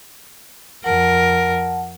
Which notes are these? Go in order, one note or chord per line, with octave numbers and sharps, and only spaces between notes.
F2 A#4 F#5 A5